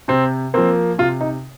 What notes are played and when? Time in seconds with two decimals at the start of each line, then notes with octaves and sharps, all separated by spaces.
0.08 C3 C4
0.54 F3 A#3 C4
0.98 C3 F4
1.21 D#4